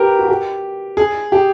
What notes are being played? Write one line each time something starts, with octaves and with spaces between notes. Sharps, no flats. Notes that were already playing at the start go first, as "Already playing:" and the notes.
Already playing: G4 A#4 B4
F#4
G4
G#4
G4